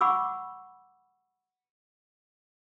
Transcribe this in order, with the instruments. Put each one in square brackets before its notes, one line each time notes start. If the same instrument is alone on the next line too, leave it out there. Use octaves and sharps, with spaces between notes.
[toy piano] F#5 B5 C#6 D6 E6